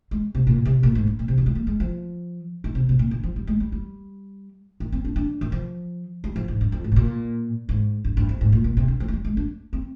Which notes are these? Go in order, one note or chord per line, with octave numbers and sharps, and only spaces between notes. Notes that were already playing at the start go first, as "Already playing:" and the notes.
G#3
C3
A#2
C3
A#2
G#2
G2
A#2
C3
D#3
G3
A#3
G#3
F3
D#3
C3
C3
A#2
D3
F3
G3
G#3
G3
G3
D#3
C4
D4
D4
D#3
F3
G3
F3
G#2
G2
F2
G#2
C3
A#2
G#2
G2
G2
F2
G#2
A#2
A#2
C3
D3
F3
G#3
G3
G#3
D4
C4